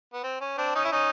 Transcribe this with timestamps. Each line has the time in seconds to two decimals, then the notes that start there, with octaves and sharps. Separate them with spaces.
0.13 B3
0.23 C4
0.41 C#4
0.58 C4 D4
0.75 C#4 D#4
0.84 E4
0.92 C#4 D#4